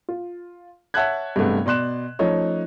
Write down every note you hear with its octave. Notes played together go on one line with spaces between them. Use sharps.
F4
C#5 E5 F#5 A5 F#6 G#6
G2 C3 G#3 A3 B3
B2 D5 C6 F#6 E7
F3 A3 C#4 D#4 C#5